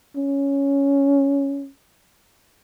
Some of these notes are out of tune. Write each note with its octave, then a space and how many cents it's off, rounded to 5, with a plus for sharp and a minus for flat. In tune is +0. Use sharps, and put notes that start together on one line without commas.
C#4 +5